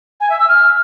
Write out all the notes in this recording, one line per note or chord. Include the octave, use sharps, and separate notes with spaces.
G#5
E5
E6
F6